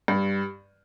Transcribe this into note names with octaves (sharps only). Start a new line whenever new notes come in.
G2